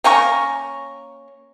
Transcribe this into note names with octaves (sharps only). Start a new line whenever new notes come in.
A#3 C#4 A#4 C#6